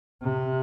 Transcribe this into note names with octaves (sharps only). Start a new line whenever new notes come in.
C3